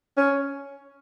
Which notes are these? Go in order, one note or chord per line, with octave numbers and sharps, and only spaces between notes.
C#4